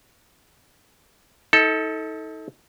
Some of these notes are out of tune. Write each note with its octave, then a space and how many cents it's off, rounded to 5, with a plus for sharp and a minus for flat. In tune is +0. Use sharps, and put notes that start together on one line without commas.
D#4 +40 A4 +0